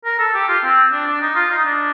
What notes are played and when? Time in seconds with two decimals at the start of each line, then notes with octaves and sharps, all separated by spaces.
0.05 A#4
0.19 A4
0.34 G4
0.48 F4
0.63 C4
0.92 D4
1.06 D4
1.21 D#4
1.35 F4
1.50 D#4
1.65 D4